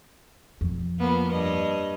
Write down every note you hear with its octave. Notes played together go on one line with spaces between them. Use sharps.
F2 B2
F3 A#3 B3
G2 D#5